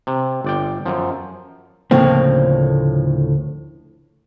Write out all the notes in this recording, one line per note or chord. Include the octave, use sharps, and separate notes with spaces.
C3
G1 D5 G5
F#2 F3
D2 A2 C#3 F3 A#3 C4